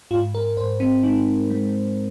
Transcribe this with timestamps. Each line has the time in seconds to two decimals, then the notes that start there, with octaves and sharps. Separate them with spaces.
0.11 G#2 F4
0.35 A#4
0.57 G#2 C5
0.80 C4
1.03 G#3 D#4
1.50 G#3